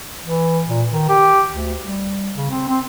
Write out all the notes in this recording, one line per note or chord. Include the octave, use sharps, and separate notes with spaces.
E3
A#2
D#3
G4
D2
G3
C#3
C4
C4